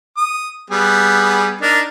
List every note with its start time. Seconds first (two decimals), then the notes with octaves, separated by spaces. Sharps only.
0.17 D#6
0.70 G3 B3 G#4
1.61 D4 D#4 A#4